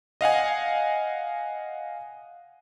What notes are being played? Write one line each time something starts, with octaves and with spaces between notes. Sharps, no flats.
D#5 F5 F#5 G#5